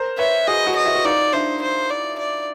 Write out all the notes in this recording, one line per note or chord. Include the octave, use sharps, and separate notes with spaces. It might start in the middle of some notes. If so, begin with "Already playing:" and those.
Already playing: A#4 C5
B4 C#5 E5
F#4 G#4 D#5
F#4 G#4
D#5
E4 F#4
F#4
D#4 F4 D5
D4 E4 C5
C5
D5
D5